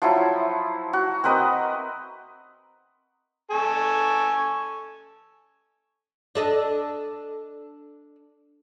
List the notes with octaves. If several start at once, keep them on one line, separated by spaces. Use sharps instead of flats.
F3 F#3 E4
F#4
C4 A#4 B4 D#5
A4 G#5 C#6
D4 A4 D#5